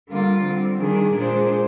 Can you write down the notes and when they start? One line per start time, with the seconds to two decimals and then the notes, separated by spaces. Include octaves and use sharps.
0.09 D3 G3 A#3 F4
0.44 D3 G3 C4
0.80 D#3 G3 D4 G#4
1.15 A#2 G#3 D4 G#4 C5